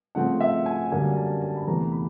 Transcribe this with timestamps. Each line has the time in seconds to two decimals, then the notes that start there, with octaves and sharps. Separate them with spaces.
0.15 C#3 F3 A3 C4 F#5
0.40 E5
0.66 G#5
0.91 F#2 D3 G3 A#3 D4 G#5
1.16 A5
1.41 A5
1.56 B5
1.66 E2 C3 E3 A3 A#5
1.92 B5